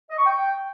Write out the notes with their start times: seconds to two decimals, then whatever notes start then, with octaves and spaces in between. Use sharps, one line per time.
0.10 D#5
0.18 C#6
0.26 G5